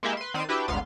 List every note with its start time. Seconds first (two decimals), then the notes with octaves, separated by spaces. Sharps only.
0.03 G#3 A#3 E4 G4 E5
0.17 B4 C6
0.34 D#3 C4 D5 C7 D#7 E7
0.49 D4 E4 F#4 G4 B4 G5
0.68 G#1 D2 B3 F5 C6